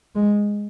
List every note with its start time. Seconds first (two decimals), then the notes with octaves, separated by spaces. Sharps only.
0.15 G#3